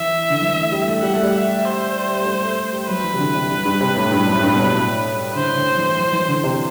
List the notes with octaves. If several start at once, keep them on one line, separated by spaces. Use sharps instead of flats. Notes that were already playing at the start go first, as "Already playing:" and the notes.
Already playing: E3 E5
D3
E3
A3
G3
A3
G3 F#5
A3
G3
E5
C5
A3
G3
A3
G3
F#3 B4
E3
C3
D3
C3
G2
G2
C3
A2
G2
F#2
A2
G2
B2
A2
D3 C5
D3
E3
F#3
E3
D3
C3